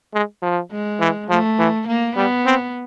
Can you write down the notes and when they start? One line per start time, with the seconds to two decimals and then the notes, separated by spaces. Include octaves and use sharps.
0.14 G#3
0.42 F3
0.71 G#3
1.00 E3
1.29 F3 A3
1.59 E3
1.88 A#3
2.16 G3 B3
2.46 C4